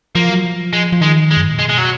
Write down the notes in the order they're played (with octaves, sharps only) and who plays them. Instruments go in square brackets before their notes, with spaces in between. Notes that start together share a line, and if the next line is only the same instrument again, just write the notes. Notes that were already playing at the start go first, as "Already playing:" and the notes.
[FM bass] F3 [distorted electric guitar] A#3
[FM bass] F#3
F3
[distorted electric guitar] G#3
[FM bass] F3
[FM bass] D#3 [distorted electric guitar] G#3
[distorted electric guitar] G#3
[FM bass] F#2
G#2
A#2
[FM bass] B2 [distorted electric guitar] G#3
[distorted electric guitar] G#3
F#3